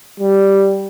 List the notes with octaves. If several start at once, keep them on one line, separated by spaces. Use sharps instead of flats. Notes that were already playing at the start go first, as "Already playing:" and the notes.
G3